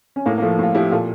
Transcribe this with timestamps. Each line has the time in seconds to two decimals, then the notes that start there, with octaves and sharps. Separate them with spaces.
0.16 C#4
0.26 A2 A#3
0.38 A#3
0.42 F3 A3
0.59 A2 F4
0.75 F3 E4 G4
0.91 A#2 F4 A4